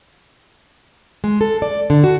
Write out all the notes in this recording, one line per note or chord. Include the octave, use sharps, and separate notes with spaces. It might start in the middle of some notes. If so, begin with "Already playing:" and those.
G#3
A4
D5
D3
F#4